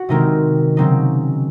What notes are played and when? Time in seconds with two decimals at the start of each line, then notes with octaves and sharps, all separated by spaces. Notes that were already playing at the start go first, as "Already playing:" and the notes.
Already playing: F#4
0.09 C3 D#3 G#3 C4 D#4 A#4
0.77 C#3 F#3 C4 D#4